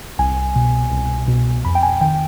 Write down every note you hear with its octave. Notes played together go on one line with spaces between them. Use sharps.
C2 G#5
B2
C2
B2
F2 B5
G5
G#5
D#3 G5